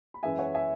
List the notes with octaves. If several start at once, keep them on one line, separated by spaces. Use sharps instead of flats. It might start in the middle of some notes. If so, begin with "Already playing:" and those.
B5
F#2 E3 G#3 E5 G#5
C#5 F#5
E5 G#5